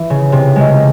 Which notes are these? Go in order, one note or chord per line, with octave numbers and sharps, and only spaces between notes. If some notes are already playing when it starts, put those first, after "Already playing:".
Already playing: E3
C#3
C3
G#3